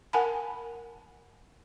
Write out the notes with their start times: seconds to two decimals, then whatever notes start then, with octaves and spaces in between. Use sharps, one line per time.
0.13 A#4 F#5 G#5 A5 B5